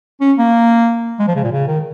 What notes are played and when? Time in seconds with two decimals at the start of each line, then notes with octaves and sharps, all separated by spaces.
0.21 C#4
0.38 A#3
1.19 G#3
1.28 F3
1.36 C#3
1.44 A#2
1.52 C#3
1.68 D#3